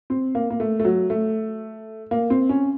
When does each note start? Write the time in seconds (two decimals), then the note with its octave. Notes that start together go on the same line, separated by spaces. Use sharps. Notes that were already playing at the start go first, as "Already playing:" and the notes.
0.10 C4
0.35 A#3
0.50 A#3
0.60 A3
0.80 A3
0.84 F#3
1.10 A3
2.11 A#3
2.30 C4
2.49 C#4